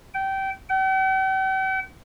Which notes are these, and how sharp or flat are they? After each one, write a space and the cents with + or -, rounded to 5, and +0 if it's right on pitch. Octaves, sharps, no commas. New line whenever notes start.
G5 -20
G5 -45